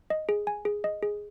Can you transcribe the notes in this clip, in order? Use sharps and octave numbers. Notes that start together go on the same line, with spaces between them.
D#5
G#4
G#5
G#4
D#5
G#4